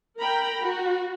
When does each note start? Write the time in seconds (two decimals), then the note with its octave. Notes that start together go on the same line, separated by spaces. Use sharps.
0.20 A#4 G5 A#5 B5
0.61 F#4